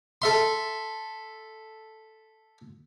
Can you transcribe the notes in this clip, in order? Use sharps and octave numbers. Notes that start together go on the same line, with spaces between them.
A4 E5 C6